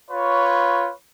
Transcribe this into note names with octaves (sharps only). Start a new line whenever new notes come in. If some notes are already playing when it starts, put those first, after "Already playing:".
F4 B4 C#5